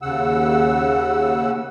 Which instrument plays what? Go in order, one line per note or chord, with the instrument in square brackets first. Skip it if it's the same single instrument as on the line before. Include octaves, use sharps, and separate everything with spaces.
[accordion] D#2 C#3 F#5 E6